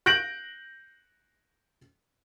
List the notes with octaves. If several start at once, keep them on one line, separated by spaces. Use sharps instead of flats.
F#6 G6 A#6 D7 F#7